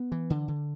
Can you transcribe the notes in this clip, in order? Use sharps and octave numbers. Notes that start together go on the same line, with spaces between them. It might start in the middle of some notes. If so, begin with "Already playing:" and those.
Already playing: B3
E3
D3
D3